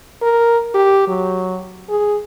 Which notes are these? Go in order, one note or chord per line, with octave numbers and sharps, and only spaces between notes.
A#4
G4
F#3
G#4